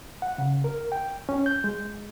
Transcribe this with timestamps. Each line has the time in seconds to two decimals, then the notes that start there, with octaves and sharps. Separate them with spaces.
0.22 F#5
0.38 C#3
0.64 A#4
0.92 G5
1.29 C#4
1.46 G6
1.64 G#3